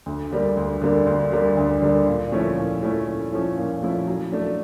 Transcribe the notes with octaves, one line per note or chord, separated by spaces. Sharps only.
D2
D3 G3 A#3 D4
D2
D3 G3 A#3 D4
D2
D3 G3 A#3 D4
D2
D3 G3 A#3 D4
A#2
F3 A3 C#4 E4
A#2
F3 A3 C#4 E4
A#2
F3 A3 C#4 E4
A#2
F3 A3 C#4 E4
F#3
A3 D4